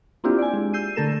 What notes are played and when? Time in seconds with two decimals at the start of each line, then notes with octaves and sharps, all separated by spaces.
0.24 A#3 C4 D4 E4 F4 G4
0.39 D5 G#5
0.53 G#3
0.73 E6 G6 C7 D#7
0.96 D3 A3 A4 A#4 E7